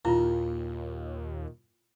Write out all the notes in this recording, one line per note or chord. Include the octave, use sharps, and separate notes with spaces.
D#2 A#2 E4 F4